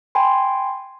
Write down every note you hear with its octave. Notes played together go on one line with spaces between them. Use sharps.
G5 G#5 B5 C6